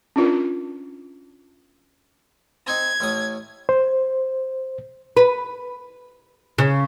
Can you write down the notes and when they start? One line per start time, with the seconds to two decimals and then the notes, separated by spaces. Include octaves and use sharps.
0.16 C#4 D4 F4 A#4
2.68 C4 D#4 G#6
3.00 A1 A2 D#6
3.69 C5
5.17 B4
6.58 C#3